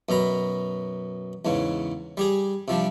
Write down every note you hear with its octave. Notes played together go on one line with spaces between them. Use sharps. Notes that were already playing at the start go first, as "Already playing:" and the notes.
F#2 B2 A#5 B5
E2 G#2 C#3
G3 G4 G#4
C3 F3 G3 D4